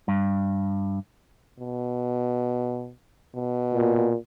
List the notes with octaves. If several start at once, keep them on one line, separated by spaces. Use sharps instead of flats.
G2
B2
B2
A#2